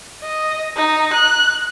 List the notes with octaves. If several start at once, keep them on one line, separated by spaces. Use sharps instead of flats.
D#5
D#4
F#6